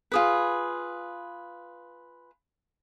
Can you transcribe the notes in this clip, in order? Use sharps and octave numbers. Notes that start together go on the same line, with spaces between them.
F4 G#4 B4